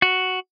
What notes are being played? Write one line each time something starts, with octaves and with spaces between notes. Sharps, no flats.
F#4